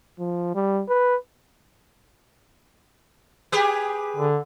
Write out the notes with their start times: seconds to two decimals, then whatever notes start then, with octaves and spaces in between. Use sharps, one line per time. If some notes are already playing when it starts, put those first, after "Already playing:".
0.19 F3
0.55 G3
0.89 B4
3.52 G4 G#4 B4
4.16 D3